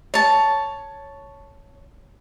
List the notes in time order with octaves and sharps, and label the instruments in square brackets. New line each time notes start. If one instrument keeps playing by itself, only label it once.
[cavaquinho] C#5 A5